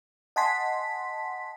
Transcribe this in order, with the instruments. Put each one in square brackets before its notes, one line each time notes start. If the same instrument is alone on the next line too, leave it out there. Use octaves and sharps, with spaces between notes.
[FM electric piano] D#5 F#5 G#5 A5 C6 B6